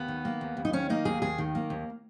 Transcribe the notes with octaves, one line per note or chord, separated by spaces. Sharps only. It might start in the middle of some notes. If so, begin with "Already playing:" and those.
Already playing: D#2 B3
D#3
A#3
D#2
D#2
D#4
D#3 C#4
A#3 D#4
D#2 G#4
D#2 G#4
D#3
A#3
D#2